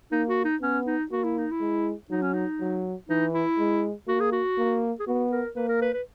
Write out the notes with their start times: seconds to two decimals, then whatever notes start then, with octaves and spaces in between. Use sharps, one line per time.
0.12 A#3 D#4
0.29 F#4
0.45 D#4
0.61 B3 C#4
0.86 D#4
1.11 A#3 F#4
1.24 E4
1.38 D#4
1.51 E4
1.60 G#3
2.10 F#3 D#4
2.22 C#4
2.33 D#4
2.60 F#3
3.09 E3 D#4
3.34 E4
3.58 G#3
4.07 A#3 F#4
4.20 G#4
4.32 F#4
4.58 A#3
5.00 G#4
5.07 B3 F#4
5.32 A#4
5.56 A#3 B4
5.68 A#4
5.81 B4
5.94 B4